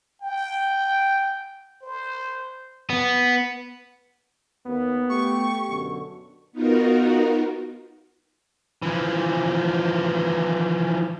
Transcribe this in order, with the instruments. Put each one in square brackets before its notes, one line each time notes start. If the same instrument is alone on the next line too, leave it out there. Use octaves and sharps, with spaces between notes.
[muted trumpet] G5
C5
[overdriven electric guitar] B3
[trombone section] D#2 [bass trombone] B3
[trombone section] A3 G4 [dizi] C#6
[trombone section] F#2 B2 D3
[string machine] B3 D#4 F4 F#4 A#4
[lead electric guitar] E3 F3